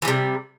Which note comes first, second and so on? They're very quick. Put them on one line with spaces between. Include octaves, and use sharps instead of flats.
E3 G3 C3